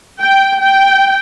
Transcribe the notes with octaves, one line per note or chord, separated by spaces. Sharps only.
G5
G5